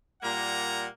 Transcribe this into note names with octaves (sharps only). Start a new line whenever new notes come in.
A#2 G3 A#3 F#5 A#5